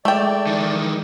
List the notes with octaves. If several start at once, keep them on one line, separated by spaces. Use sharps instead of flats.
G#3 A3 D5 G5
D#3 E3